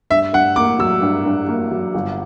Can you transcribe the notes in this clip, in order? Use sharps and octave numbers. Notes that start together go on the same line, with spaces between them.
G2 E5
G2 F#5
A#3 D6
F#3 E6
G2
G2
A#3
F#3
G1